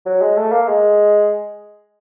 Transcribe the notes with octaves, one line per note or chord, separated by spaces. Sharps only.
F#3
G#3
A3
A#3
G#3